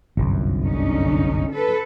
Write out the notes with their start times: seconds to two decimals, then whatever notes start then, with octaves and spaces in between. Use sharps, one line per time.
0.17 G1 C2 F#2
0.65 D3 C#4 D#4
1.51 A4 B4